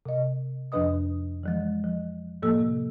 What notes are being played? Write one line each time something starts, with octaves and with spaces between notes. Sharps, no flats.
C3 D#5
F2 F3 D4 B4 D#5 D#6
E3 F3 G#3
F3
A2 F3 A#3 A4 E6
C3